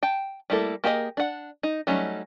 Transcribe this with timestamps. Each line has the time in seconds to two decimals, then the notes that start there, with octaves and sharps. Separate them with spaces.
0.03 G5 A5
0.50 G3 A3 A#3 E4 A4
0.84 A#3 G4 G#4 A#4 D#5
1.17 D4 F#5
1.63 D#4
1.87 F#3 G3 A3 C#4 D#4